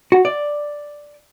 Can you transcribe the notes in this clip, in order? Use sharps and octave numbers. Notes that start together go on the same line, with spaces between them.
F#4
D5